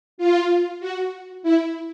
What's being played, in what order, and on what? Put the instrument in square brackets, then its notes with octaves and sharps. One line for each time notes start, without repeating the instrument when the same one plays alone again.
[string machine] F4
F#4
E4